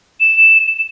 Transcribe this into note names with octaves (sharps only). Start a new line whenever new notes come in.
E7